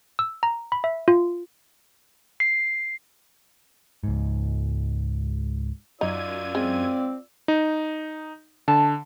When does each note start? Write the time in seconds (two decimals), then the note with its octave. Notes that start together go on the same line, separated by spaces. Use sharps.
0.19 E6
0.43 A#5
0.72 B5
0.84 E5
1.08 F4
2.40 C7
4.03 C#2 G#2
6.01 F#2 D#4 F4 D5 E6 G#6 D#7
6.55 G#3 C4
7.48 D#4
8.68 D3 A5